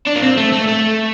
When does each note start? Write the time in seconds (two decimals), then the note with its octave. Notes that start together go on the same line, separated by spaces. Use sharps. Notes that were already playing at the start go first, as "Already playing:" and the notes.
0.07 D4
0.15 A#3
0.22 C4
0.37 A3
0.53 A3
0.68 A3